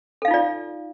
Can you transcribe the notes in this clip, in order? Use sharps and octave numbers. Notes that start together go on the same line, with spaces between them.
D#4 F4 A4 D5 F5